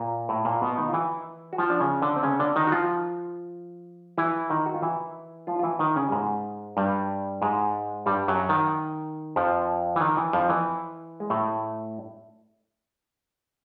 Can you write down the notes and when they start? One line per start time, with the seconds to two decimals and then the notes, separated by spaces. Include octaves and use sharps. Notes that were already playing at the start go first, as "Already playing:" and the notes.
Already playing: A#2 A#3
0.29 A2 A3
0.45 A#2 A#3
0.61 B2 B3
0.78 D#3 D#4
0.88 F4
0.93 E3 E4
1.53 F#4
1.58 F3 F4
1.70 D4
1.80 C#3 C#4
2.02 D3 D4
2.16 C4
2.23 C#3 C#4
2.39 D3 D4
2.56 D#3 D#4
2.67 F#4
2.72 F3 F4
4.18 E3 E4
4.50 D#3 D#4
4.66 F#4
4.74 F4
4.82 E3 E4
5.47 F3 F4
5.59 F4
5.63 E3 E4
5.79 D#3 D#4
5.96 C#3 C#4
6.08 G3
6.12 G#2 G#3
6.77 G2 G3
7.42 G#2 G#3
8.06 G2 G3
8.28 F#2 F#3
8.49 D#3
9.36 F2 F3
9.96 E3
10.01 D#3
10.17 E3
10.33 F2 F3
10.49 E3
11.20 G#3
11.30 A2 A3